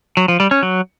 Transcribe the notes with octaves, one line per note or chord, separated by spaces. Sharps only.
F#3
F3
G3
C#4
F#3